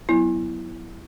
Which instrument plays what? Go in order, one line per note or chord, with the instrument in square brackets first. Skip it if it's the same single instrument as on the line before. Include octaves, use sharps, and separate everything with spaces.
[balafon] F#3 B3 E4